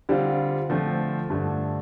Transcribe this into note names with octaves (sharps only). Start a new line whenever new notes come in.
D3 G3 C4 F4
D3 F3 A3 C4
G2 D3 A3